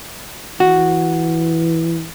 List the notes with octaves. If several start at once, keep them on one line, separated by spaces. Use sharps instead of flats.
E3 F#4